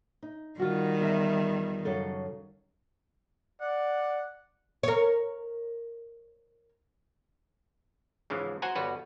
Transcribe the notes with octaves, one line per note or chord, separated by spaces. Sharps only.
D#4
D#3 G3 F4 F#4
E2 F4 E5
F#2 C#3 A4
D5 F#5
A#4 C#5
G#2 C#3 E3 F3
F#4 C5 F#5 G#5 A#5
G1 G3 F#4 B4 C#5